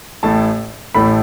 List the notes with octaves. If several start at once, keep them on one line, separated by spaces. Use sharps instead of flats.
A1 A2 A3 A5
A1 A2 A3 B5